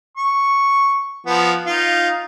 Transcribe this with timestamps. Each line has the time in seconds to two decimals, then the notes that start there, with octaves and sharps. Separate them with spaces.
0.17 C#6
1.27 F3 B3
1.66 D#4 F4